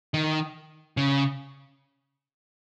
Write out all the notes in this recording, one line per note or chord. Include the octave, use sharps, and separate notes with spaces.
D#3
C#3